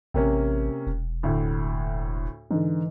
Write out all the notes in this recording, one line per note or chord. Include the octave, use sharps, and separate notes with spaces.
A1 C3 A#3 C#4
E1
D2 A2
G#2 D3 E3